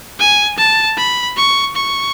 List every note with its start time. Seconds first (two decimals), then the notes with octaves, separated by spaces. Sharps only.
0.19 G#5
0.58 A5
0.97 B5
1.37 C#6
1.76 C#6